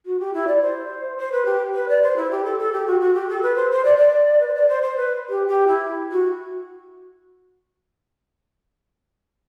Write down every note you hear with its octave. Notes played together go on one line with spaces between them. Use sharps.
F#4
G4
E4
D5
C5
C5
B4
G4
B4
D5
C5
E4
G4
A4
A4
G4
F#4
F#4
G4
A4
B4
C5
C5
D5
D5
B4
C5
D5
C5
C5
B4
G4
G4
E4
F#4